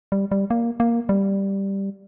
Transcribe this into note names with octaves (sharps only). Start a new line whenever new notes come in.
G3
G3
A#3
A#3
G3